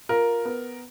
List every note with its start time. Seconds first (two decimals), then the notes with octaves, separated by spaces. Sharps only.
0.09 F4 A#4
0.45 B3